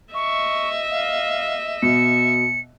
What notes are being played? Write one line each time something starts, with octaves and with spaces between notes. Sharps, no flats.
D#5 E5 C#6
F5
B2 C#7